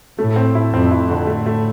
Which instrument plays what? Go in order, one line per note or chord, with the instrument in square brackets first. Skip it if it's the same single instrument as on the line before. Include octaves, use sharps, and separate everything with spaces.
[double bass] A2 [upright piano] A3
[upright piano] C4
E4
[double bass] F2 [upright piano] C4
[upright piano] E4
D3
[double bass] A2 [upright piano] A3
[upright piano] A3